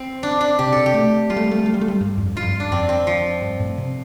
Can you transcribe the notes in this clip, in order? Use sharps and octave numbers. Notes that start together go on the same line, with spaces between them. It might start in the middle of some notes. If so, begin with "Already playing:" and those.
Already playing: C4
D4
D4
C3 G4
C3 A4
G4
A3
G3 F4
A3
G3
A3
G3
A3
G3
A3
G3
G2
F2
G2 F4
F2
G2
D4
F2 C4
C4
F3
G2
A2
C3